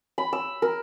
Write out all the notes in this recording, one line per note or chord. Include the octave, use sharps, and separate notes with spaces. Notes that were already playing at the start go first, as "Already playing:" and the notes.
B5
E6
A#4